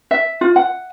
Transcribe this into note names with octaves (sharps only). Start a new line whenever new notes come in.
E5
F4
F#5